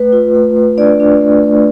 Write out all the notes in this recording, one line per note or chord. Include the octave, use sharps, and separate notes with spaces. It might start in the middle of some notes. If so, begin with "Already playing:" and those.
Already playing: A3 B4
F4
A3
A3
D4 D5
D4
A3
A3